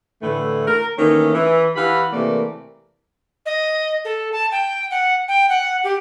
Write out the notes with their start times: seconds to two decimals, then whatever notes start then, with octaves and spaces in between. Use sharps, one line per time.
0.22 A2 D3 E3 A3
0.67 A#4
0.99 D#3 E3 A3 A#3 C#4 C#5
1.34 E3
1.76 E3 G4 F5 F#5 B5
2.13 C3 E3 A3 A#3 A#4 D5
3.46 D#5
4.05 A4
4.32 A5
4.52 G5
4.91 F#5
5.28 G5
5.49 F#5
5.84 G4